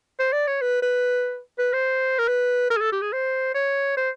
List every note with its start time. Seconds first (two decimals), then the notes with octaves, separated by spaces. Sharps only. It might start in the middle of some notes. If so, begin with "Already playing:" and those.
0.19 C5
0.33 D5
0.47 C#5
0.62 B4
0.82 B4
1.59 B4
1.73 C5
2.19 A#4
2.28 B4
2.70 A#4
2.76 G#4
2.81 A4
2.92 G4
3.01 G#4
3.13 C5
3.54 C#5
3.97 C5